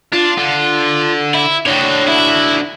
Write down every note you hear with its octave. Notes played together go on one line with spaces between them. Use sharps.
D4 F4
D3
E4
D3 F#4 C#5 G5
E4